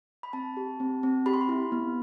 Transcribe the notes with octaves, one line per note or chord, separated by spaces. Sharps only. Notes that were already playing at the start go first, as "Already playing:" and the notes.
B5
C4 A5
G4
C4
C4
G4 B5
C6
B5
E4
B3